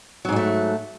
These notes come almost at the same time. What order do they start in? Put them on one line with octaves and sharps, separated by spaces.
F#3 G#2 G#3 A3